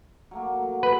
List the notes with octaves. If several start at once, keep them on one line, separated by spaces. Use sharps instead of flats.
F#3 A3 A#3
F#3
B4